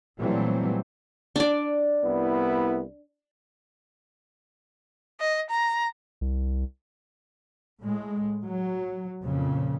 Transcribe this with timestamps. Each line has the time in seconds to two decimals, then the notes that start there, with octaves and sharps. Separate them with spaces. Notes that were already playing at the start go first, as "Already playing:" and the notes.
0.18 A#2 E3 F#3 G3 A3 C4
1.36 D4 D5
2.05 C2 B3 E4
5.20 D#5
5.50 A#5
6.21 C2
7.81 A2 G#3
8.44 F#3
9.23 F2 A#2 C#3